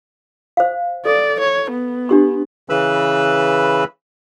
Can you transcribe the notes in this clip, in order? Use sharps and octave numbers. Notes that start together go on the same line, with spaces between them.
C5 F5
A4 D5
C#5
B3
D4 G4 C6
C#3 E3 B4 B5 E6